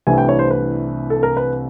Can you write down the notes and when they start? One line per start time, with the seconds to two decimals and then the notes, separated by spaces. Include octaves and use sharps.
0.07 C2 C3 E3 A3 D4 G#5
0.18 G5
0.29 C#5
0.39 C5
0.51 B4
1.10 A4
1.23 A#4
1.37 B4